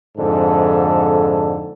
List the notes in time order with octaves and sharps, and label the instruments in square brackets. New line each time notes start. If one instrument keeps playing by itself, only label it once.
[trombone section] F2 G#2 D3 A4